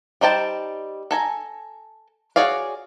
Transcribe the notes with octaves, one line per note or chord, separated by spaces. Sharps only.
G3 D#4 C5 G5 A5
A4 G#5 A#5
F#4 G#4 C#5 D5 F5